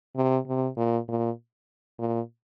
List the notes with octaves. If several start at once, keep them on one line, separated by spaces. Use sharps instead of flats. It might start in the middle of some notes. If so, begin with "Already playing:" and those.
C3
C3
A#2
A#2
A#2